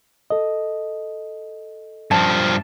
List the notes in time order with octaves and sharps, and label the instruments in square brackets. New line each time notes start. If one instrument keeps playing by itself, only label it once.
[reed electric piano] A4 D#5
[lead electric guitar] G2 F3 [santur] A5